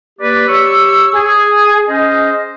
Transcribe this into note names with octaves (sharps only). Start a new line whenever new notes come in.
A#3 G4 B4 D5
G4 C#5 C#6 E6
G#4
C#4 G#4 C5 D#5